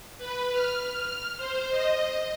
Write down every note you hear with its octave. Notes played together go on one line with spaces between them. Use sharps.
B4
F6
C5
D#5